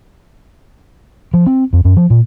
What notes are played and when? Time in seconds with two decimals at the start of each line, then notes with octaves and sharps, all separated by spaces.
1.34 F3
1.46 C4
1.73 F2
1.85 F#2
1.97 F3
2.10 A#2